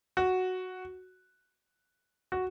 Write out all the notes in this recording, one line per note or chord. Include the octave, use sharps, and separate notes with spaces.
F#4
F#4